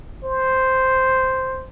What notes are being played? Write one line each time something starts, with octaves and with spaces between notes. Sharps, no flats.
C5